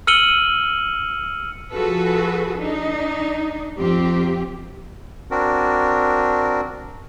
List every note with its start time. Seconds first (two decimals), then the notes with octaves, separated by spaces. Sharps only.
0.07 E6 F6 C#7 D#7 F#7 G7
1.71 F3 F#4 G#4 A4 B4
2.58 D4 D#4
3.77 F2 C4 G4
5.31 C4 D4 F#4 A#4